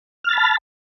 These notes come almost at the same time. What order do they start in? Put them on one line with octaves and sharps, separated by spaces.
F6 A6 B5 A5